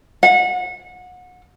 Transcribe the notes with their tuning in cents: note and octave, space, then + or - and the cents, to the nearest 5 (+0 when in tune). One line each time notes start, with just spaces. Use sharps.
F#5 -30